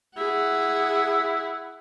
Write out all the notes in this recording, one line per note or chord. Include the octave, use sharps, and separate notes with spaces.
E4 G#4 F#5